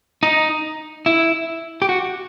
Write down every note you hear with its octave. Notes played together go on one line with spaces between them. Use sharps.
D#4
E4
G4
F#4